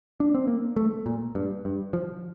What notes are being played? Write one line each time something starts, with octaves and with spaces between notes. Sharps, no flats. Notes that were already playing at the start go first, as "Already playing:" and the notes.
D4
C4
A#3
A3
A#2
G2
G2
F3